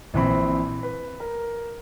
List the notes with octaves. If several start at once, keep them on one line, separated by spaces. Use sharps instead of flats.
A#1 E3 C4 B5
B4
A#4